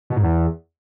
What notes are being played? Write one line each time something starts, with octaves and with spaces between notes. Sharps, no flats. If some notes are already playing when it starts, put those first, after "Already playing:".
B2
G#2
E2